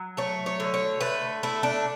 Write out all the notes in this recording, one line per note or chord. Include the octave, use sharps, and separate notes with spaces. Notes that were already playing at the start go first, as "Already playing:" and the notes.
Already playing: F#3
A3 C#5
C#5
D3
C#5
A3 B4
A3 E4
D4